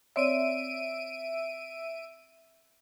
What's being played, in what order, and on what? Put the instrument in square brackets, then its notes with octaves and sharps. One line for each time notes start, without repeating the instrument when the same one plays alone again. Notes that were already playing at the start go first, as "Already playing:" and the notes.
[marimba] C4 C#5 D5 [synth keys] E5 D7 D#7